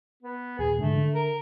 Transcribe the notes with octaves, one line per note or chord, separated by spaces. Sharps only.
B3
D#2 A#2 G#4
G#2 D3 A3
D3
A#4